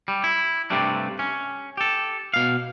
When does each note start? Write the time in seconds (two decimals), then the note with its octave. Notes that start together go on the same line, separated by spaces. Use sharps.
0.08 G3
0.24 E4
0.70 G2 C3 G3 A3 D4
1.19 C#4
1.77 G4 A4
2.34 B2 F5